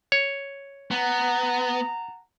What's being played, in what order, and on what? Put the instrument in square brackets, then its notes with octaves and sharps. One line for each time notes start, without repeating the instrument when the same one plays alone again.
[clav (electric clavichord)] C#5
[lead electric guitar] B3 [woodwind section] F#5 A5 A#5